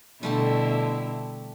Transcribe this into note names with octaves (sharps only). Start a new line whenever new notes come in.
B2 D3 G3 A3 E4 G4